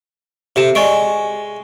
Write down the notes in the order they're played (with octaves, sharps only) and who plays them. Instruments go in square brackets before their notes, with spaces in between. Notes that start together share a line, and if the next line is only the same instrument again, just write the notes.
[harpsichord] C3 [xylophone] A4 E5 E7
[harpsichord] G#3 [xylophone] D5 C#6 D7